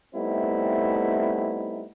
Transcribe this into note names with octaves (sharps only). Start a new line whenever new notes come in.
G3 A3 B3 C4 D#4 E4